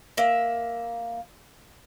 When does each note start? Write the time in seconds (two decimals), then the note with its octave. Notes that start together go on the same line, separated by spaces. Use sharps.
0.17 A#3 E5